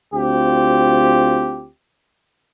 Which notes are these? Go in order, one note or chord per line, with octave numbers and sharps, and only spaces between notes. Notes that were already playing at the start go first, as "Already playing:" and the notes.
D2 C4 F4 G4